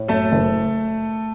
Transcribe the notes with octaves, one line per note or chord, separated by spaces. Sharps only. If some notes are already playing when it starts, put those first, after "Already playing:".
Already playing: A2
F#2 A3 A4
F#1